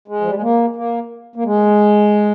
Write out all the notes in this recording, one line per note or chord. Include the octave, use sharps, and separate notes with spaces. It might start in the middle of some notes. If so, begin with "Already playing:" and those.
G#3
F3
G3
G#3
A#3
A#3
A#3
G#3